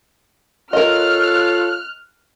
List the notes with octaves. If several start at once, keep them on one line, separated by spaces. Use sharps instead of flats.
F4 A4 A#4 C#5 D#5 F6 F#6